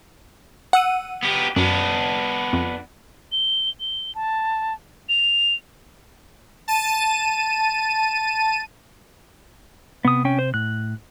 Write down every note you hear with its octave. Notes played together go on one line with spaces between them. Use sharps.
F#5 E6 D#7
B3 G4
F#2 B3 D4
F2
G7
G7
A5
F7
A5 D#7
C3 B3 D#6
C#4 G5
C5
A2 F#6